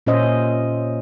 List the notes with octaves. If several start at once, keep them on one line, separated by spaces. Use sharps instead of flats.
A#2 C#4 C5 D#5 E5